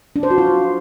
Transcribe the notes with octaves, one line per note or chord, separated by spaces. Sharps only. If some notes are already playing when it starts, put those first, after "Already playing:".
D4
C5
F#4
F4